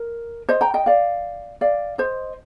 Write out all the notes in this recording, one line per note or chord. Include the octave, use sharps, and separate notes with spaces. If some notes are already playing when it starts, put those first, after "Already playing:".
Already playing: A#4
C5 D#5
G5 A#5
D#5 G5
D5 F5
D5 F5
C5 D#5